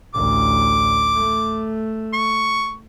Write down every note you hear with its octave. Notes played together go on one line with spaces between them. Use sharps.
A1 D2 D6
A3
C#6